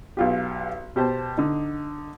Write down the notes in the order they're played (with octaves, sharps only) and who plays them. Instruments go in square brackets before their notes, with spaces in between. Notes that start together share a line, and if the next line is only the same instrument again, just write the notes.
[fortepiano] B1 F4 G4
B2 G4 C5 A5
D3 D#4